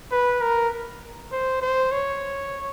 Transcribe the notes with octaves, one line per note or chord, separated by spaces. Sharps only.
B4
A#4
C5
C5
C#5